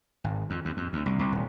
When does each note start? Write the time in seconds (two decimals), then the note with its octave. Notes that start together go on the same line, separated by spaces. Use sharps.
0.24 G#1
0.50 F2
0.65 D#2
0.77 F2
0.93 D2
1.06 C2
1.19 C2
1.32 D#1